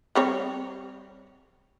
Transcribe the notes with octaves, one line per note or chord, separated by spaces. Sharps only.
G3 C4 C#5